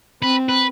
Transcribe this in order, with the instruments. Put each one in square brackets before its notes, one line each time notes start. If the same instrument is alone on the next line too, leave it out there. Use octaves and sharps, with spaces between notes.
[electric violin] C4 [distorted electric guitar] B4
[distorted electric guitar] B4